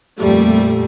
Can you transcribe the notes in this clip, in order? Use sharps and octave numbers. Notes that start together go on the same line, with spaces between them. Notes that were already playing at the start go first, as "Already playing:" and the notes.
F2 A#2 G3 A3